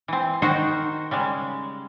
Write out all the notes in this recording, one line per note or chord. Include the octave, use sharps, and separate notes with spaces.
E3 C4
D#3 D#4 F#4 A#4 C5 F#5
C#3 G3 G#3